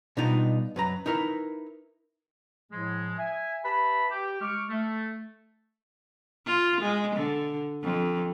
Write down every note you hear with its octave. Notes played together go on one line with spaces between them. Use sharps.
B2 G3 B3 D4 D#4 F4
F#2 B4 A#5
D#4 E4 A#4 B4
A2 F3 G#3
E5 G#5
G4 B4 E5 A5 B5
G4
G#3 C#6 D6 F6
A3
F4
G#3
D3
F2